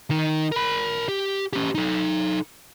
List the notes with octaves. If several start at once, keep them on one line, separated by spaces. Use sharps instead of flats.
D#3 D#4
A#4 B5
G4
C#4 G4
D#4 A4